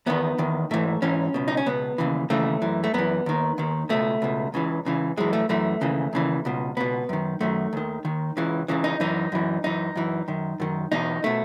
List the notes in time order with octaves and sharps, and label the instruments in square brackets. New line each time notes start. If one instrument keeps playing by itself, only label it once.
[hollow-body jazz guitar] E2 D#3 B3
E2 D#3
G#2 E3 A3
G#2 E3 C#4
C#2 B2
D#4
C#4
C#2 B2 B3
D#2 C#3 E3
D#2 C#3 E3 A3
F#2 E3
A3
F#2 E3 B3
D#2 D#3
D#2 D#3
C#2 B2 A3
C#2 B2
C#2 C#3 E3
C#2 C#3 E3
F#2 E3 G#3
A3
F#2 E3 A3
D#2 C#3 E3
D#2 C#3 E3
C#2 B2
C#2 B2 B3
F#2 D#3
F#2 D#3 A3
D#2 D#3
D#2 D#3
C#2 C#3 E3
C#2 C#3 E3
D#4
F#2 E3 D#4
F#2 E3
F#2 E3 D#4
F#2 E3
F#2 D#3
F#2 D#3
E2 B2 D#4
B2 A3